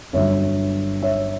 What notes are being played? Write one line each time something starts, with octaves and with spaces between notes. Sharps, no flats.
G1 G2 D3 F#3 C#5 E5
C#5 E5